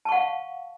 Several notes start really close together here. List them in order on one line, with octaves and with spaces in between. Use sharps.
A5 C#6 F#5 F5